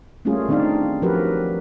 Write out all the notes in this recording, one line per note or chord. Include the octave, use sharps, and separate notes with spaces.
G3 A3 A#3 C#4 F4 G#4
D#3 C4 D4 D#4 D5 F5
F3 F#3 F#4 G4 A#4 B4